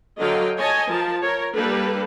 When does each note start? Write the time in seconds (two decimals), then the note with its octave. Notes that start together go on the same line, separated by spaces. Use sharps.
0.20 D3 F#3 D#5 F5 G5
0.58 C#5 D#5 G#5 A5
0.89 F3 A#4 A5
1.22 A#4 C#5
1.55 G3 A#3 D4 G4 A4 B4